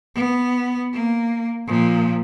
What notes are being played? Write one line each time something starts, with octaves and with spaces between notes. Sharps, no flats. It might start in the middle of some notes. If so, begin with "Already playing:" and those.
B3
A#3
A#2 F3